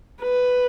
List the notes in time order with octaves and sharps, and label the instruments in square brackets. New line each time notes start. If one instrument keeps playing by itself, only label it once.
[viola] B4